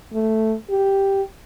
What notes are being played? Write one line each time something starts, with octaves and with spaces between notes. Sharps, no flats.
A3
G4